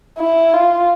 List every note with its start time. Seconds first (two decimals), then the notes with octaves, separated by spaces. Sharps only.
0.18 E4
0.53 F4